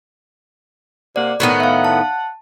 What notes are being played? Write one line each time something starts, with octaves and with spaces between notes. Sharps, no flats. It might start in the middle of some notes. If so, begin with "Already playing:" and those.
C3 A#3 D5 F#5
A2 D#3 B3 F#5
E5 F5
A5